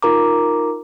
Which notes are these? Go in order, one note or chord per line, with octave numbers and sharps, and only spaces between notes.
D#4 F4 A#4 A#5 D6